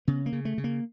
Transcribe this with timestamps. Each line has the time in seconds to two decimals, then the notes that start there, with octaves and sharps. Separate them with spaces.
0.08 C#3 B3
0.26 A#3
0.32 C#3
0.45 A3
0.58 C#3
0.64 A#3